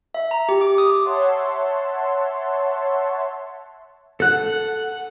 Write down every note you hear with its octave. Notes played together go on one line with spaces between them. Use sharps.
E5
A#5
G4
D6
D#6
C#5 E5 F#5 A5 C6
A4 F#5 F#6